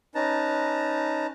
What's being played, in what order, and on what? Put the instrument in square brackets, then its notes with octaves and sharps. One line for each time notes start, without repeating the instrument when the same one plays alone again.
[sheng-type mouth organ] C#4 D#4 B4 A5 A#5